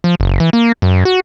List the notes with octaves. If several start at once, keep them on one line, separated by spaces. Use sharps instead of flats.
F3
F#1
E3
A#3
F#2
F#4